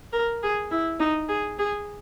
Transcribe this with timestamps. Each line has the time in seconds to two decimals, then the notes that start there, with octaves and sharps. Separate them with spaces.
0.13 A#4
0.43 G#4
0.71 E4
1.00 D#4
1.29 G#4
1.59 G#4